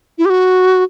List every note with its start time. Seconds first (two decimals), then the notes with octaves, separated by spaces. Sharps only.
0.18 E4
0.25 G4
0.30 F#4